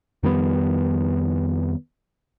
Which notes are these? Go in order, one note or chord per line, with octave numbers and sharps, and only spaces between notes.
F2 D#3 G3 B3